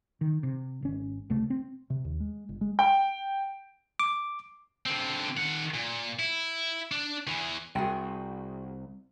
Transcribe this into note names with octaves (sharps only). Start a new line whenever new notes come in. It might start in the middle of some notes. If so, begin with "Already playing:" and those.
D#3
C3
G#1 C#4
C#2 C3 A3
C4
C3
D#2
G#3
G1
G#3
G5
D6
D3 C4
D#3 F#5
A#2
E4
D4
E2 E3
C2 F#4 G#4 G5